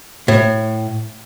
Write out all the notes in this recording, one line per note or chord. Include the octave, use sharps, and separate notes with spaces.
A2